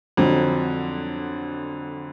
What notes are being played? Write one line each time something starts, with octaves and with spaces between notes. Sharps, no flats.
F2 D3 F#3